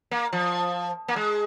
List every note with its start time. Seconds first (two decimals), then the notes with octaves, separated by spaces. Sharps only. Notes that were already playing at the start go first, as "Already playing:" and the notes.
0.11 A#3
0.33 F3
1.08 A#3
1.16 G#3